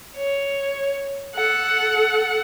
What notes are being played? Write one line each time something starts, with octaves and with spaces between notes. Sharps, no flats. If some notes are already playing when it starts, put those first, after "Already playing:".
C#5
A4 F#5